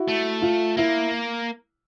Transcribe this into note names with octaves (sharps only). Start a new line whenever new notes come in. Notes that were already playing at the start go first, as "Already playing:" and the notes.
Already playing: E4 F#4
A3
F4
A#3 E4